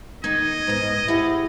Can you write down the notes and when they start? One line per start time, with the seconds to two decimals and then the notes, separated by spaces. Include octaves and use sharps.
0.24 D#3 A#3 D#4 D#5 G#6
0.67 G#2 B3
1.08 E4 G4 G#4 F#5